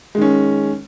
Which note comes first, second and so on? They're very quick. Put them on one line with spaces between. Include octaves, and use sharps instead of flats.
G#3 D#3 C#4